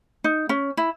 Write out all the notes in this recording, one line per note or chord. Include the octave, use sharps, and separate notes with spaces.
D#4
C#4
E4